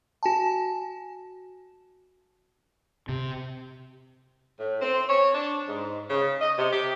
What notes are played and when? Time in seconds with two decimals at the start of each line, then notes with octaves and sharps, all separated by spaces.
0.23 F#4 G#5 A5
3.09 C3
4.60 A2
4.82 C4
5.09 C#5
5.35 D4
5.68 G#2
6.10 C#3
6.42 D#5
6.59 C3
6.73 G4